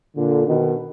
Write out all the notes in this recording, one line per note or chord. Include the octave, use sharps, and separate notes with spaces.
A#2 D3
B2 D#3